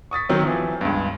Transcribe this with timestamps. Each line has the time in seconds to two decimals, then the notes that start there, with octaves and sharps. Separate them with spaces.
0.11 C#6 D#6 A6 B6
0.29 D#3 F#3 C4
0.43 E3 F3
0.81 C#2 G2